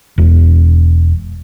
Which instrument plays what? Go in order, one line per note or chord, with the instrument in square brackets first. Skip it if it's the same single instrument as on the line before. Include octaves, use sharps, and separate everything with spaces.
[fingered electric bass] E1